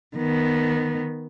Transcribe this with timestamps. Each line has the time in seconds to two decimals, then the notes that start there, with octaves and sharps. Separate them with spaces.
0.16 D#3 B3